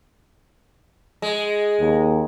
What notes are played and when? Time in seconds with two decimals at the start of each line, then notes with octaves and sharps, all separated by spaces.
1.22 G#3
1.80 D#2